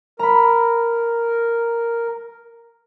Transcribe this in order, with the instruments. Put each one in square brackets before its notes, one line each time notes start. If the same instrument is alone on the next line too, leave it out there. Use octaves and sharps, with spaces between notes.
[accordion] A#4 [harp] A#5 B5